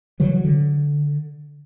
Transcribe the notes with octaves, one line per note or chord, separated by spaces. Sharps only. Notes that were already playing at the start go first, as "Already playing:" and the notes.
C#3 E3 F#3 G3
D3